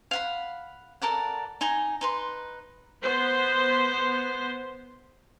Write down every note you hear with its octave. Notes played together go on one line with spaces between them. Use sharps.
F5 F#5 B5
A4 A#4 D5 F#5
D#4 G#5 A#5
D#4 B4 C6
B3 C5